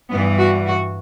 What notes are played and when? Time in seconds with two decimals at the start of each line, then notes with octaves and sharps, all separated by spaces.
0.11 G2 E3 G3 B3
0.38 F#4
0.66 F#4